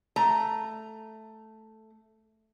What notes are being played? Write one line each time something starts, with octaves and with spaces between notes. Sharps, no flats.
A3 A#5